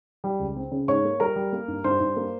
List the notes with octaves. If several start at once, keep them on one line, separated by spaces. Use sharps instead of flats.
G3
C#2
C4
C#3
G#2 C#5 C#6
A#3
G3 A#4 A#5
G3
A#3
G2
G2 C5 C6
G2
A#3